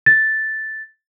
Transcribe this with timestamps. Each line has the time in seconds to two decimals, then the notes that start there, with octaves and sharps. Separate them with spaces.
0.06 A6